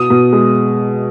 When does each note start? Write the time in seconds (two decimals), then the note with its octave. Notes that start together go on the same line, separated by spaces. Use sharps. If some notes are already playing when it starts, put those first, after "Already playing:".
Already playing: B2 D#6
0.10 B2
0.33 G#3